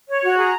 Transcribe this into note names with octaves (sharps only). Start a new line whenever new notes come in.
C#5
F#4
G#4 A#5